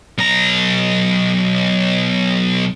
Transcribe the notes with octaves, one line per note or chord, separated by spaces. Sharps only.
B1 A#5